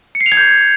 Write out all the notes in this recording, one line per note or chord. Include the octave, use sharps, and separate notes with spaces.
C#7
C7
F7
G#6
G6